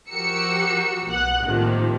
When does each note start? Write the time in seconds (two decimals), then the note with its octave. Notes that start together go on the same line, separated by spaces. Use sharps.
0.10 F3 F#4 G4 A#4 E6 C#7
1.08 B1 B3 F#5 F#6
1.43 A2 C3 D#3 F3 A#3